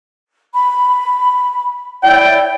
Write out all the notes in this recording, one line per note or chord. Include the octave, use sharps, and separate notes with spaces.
B5
E4 C#5 D5 G5